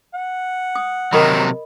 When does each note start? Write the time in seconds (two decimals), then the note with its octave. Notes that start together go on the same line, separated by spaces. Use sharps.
0.15 F#5
0.75 D#6
1.13 C3 D#3 F#3 A#4 D#5 B5